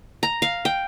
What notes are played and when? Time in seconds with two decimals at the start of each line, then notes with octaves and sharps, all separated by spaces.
0.23 A#5
0.42 F5
0.65 G5